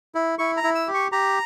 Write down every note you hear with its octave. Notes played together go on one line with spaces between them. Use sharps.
E4
E4 C#6
A#5
E4
E6
G4
C#6
G4 A#5